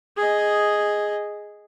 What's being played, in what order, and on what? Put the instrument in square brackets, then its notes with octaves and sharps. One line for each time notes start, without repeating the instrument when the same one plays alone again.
[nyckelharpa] G#4 D#5